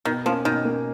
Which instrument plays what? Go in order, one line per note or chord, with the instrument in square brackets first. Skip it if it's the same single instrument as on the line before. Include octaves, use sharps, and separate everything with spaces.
[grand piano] B2 [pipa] D#3
[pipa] F3 [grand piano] A#3 C#4
[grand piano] B2 [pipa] D#3
[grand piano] A#3 C#4